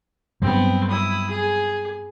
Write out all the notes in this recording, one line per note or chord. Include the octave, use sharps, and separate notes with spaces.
G2 F#3 B3 C4
E4 D#6
G#4